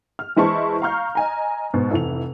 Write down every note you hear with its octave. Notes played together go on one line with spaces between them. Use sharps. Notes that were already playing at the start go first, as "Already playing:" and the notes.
F6
E3 G#3 E4 C5 A5 C#6
F5 A#5 C#6 F6 G6
D#5 G#5 A#5
G#2 B2
F1 E3 F7